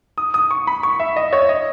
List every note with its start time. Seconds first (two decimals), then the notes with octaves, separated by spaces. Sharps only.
0.18 D#6
0.34 D#6
0.51 C#6
0.67 B5
0.83 C#6
1.00 E5
1.16 D#5
1.33 C#5
1.49 D#5